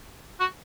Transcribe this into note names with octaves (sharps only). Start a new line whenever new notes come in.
F#4